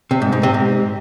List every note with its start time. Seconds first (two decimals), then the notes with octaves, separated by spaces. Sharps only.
0.11 C3
0.22 G#2
0.32 G#2
0.43 C3
0.54 G#2